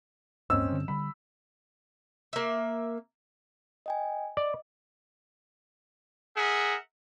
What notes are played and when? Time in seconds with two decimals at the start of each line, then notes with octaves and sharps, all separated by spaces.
0.50 D1 G2 A#3 C4 C#4 D#5 E6
0.69 G2 D3
0.88 D3 G3 B5
2.33 A#3 E5
3.86 D#5 G5 G#5
4.37 D5 D#5
6.36 G#4 A#4 E5 F#5